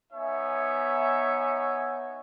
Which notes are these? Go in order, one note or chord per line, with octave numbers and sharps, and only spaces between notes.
B3 D#4 C#5 E5 G#5